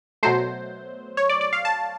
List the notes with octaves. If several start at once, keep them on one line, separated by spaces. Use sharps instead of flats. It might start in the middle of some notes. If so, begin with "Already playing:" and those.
B2 F#3 A3 C5
C#5
D5
D5
F5
A5